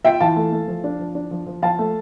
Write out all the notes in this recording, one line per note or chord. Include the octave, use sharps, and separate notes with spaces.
F4 E5 G5
E3 F5 A5
A3
A3
F3
D4
F3
D4
F3
F3
F3 F5 A5
A3